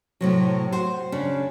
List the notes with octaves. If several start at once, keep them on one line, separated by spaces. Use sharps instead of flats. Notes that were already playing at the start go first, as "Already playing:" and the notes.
A2 C3 F#3
F#4 C5
C#3 C#4 D4